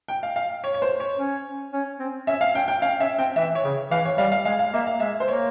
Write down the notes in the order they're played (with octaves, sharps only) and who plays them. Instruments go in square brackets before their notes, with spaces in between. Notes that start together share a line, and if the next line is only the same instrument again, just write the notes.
[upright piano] G5
F5
F5
C#5
C#5
C5
C#5
[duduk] C#4
C#4
C4
[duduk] C#4 [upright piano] E5
[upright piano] F5
[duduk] C#4 [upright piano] G5
[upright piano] G5
[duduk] C#4 [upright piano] F5
[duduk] C#4 [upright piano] E5
[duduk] C4 [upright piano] G5
[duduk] E3 [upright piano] E5
[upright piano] C#5
[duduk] C#3
[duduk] E3 [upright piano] F5
[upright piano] C#5
[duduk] G3 [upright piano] F5
[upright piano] F5
[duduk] G#3 [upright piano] F5
[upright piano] F5
[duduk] A#3 [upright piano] E5
[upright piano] F5
[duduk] G#3 [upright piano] E5
[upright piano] C5
[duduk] A#3 [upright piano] C#5